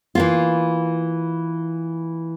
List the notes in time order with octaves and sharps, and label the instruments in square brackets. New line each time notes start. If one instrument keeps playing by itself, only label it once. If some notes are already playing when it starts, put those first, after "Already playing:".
[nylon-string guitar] E3 A#3 F4